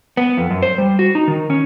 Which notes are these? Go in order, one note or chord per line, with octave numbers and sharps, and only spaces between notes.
B3
F2
F#2
C5
G3
F#4
D#4
D#3
C#4